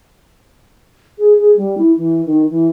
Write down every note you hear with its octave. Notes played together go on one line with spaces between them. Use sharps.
G#4
G#4
G3
E4
E3
D#3
E3